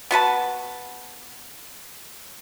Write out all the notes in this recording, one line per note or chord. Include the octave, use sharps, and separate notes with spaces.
B3 F#4 B4 A5